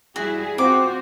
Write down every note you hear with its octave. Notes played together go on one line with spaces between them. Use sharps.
G3 E4 F#4 G#4
C4 F4 F#4 C5 D6